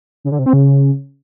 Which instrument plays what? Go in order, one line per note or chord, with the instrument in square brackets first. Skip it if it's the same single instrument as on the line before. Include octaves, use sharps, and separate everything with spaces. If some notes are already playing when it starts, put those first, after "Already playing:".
[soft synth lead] C#3
D3
C3
C4
C#3